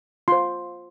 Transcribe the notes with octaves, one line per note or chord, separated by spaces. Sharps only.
F4 C5 C6